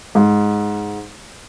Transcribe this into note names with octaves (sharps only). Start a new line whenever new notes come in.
G#2